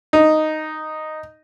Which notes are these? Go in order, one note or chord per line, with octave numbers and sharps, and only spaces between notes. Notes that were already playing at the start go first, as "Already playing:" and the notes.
D#4